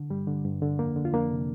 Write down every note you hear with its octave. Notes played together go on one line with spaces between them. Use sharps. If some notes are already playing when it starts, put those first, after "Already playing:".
Already playing: D3
G2 G3
D3
G2
D3
F2 A#3
D3
F4
F2 A#3 D4
C3